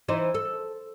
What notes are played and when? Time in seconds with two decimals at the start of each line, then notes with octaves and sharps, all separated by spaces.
0.08 E3 D#4 C5
0.34 A4